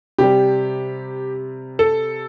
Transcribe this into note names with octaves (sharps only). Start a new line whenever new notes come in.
C3 G3 G4
A4